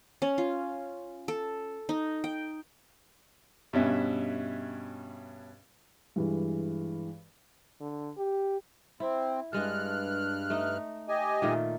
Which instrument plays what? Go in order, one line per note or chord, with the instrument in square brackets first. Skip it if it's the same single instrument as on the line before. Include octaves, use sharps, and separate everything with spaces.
[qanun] C#4
F4
A4
D#4
G5
[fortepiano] G2 B2 C#4 E5
[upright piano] G2 E3 G#3
[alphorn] D3
G4
[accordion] C4 [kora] E4
[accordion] G2 F6 F#6 [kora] G#3 A4
[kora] A3 D#4
[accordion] G4 D#5 G#5
[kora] A#2 D#3 A3